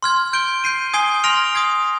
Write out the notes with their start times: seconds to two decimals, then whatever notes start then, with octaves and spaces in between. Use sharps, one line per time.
0.03 C6 F6 G#6
0.33 G6 D7 G7
0.64 G6 C7 D#7
0.93 G#5 D#6 G#6 C7 G7
1.24 C6 F6 A#6 D7 F7
1.55 D#6 G#6 C7